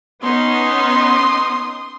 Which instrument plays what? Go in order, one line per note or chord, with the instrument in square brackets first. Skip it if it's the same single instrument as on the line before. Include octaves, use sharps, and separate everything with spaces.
[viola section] B3 C#4 D#4 [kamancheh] C6 D#6